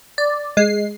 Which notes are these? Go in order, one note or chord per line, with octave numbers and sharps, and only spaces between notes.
D5
G#3 C7